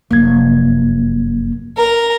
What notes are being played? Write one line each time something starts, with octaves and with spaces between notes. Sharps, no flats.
F1 F#2 A#3 G#6
A#4 A#5